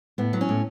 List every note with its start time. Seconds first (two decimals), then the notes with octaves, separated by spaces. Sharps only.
0.18 A2 B3
0.33 F#3
0.41 C#4
0.49 A2